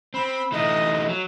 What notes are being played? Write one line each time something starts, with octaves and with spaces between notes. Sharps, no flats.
C4 B5
E3 A3 D#4 D#5
F#3